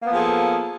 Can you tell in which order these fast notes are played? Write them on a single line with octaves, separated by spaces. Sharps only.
A#3 B3 F3 G#4 A4